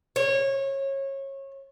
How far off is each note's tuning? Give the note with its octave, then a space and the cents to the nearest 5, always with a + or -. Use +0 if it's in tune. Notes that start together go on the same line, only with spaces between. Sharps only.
C#5 -25